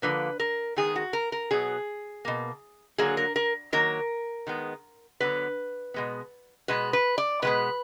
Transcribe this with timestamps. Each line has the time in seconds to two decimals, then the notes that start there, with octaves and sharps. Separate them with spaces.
0.02 D3 F3 A#3 B4
0.40 A#4
0.76 D#3 G#3 B3 G#4
0.96 F#4
1.13 A#4
1.32 A#4
1.51 B2 F#3 B3 G#4
2.25 B2 A#3
2.98 D3 F#3 A#3 G#4
3.17 A#4
3.36 A#4
3.72 D#3 F#3 A#3 A#4
4.47 D#3 G#3 B3
5.20 D3 F#3 B3 B4
5.94 B2 G#3 B3
6.68 B2 G#3 B3 B4
6.93 B4
7.18 D5
7.42 B2 G#3 B3 B4